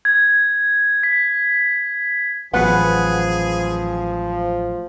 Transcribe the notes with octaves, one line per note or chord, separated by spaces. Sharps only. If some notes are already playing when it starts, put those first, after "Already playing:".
G#6
B6
A1 F3 F#3 B3 G#4 B4 F#5